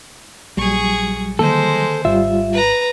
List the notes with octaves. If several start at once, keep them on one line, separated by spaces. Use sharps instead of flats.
A#1 F#3 G3 G#4 C#6
D3 D#3 G#3 A#3 A4 C5
G#1 G3 F4 E5
B4 A#5